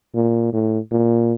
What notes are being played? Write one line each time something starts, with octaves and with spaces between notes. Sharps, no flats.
A#2
A2
A#2